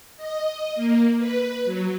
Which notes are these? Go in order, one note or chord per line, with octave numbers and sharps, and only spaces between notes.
D#5
A#3
B4
F#3